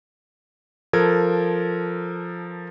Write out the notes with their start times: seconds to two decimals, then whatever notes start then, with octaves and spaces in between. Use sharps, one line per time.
0.93 F3 A4 A#4 G#6